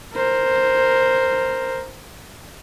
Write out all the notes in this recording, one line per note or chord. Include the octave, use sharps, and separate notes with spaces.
A#4 C5